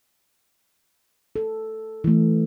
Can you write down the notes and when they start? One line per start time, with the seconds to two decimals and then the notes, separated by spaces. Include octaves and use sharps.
1.36 A4
2.04 E3 A3